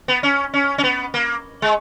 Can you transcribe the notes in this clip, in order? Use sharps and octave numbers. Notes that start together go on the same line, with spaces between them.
B3
C#4
C#4
C#4
B3
A#3
G#3